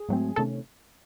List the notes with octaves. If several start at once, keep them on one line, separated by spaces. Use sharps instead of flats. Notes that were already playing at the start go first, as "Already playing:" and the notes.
Already playing: G#4
G#2 F#3 A3 C4
C3 D#3 A3 C#4 A4